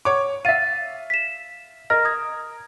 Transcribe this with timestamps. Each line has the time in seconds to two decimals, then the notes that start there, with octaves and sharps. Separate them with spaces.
0.05 C#5 D6
0.45 E5 F5 A6 D#7
1.10 B6 E7
1.90 A#4 D#5 F6 A#6
2.05 D#6 G#6